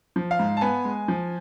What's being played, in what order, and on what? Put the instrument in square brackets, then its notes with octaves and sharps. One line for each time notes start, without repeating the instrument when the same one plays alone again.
[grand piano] F3
F5
G#2
A5
B3 G#5
G#3
F3